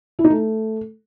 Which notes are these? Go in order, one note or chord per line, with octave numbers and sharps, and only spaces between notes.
E4
D#4
A3